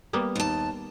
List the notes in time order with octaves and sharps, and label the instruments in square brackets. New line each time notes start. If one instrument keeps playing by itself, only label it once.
[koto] G3 A#3 B3
[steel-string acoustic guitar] D#2 A5